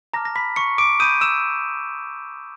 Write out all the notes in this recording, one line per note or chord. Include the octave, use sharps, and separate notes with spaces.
A5 A#5 D6 F6 A#6
A#6
B5 B6
C#6 C#7
D6 D7
B5 D#6 G6 D#7
E6 E7